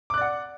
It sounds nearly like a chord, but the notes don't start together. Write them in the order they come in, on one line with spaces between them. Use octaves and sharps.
D6 F#6 D5 F#5